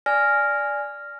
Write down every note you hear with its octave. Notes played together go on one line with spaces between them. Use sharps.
D5 G#5 F6 A#6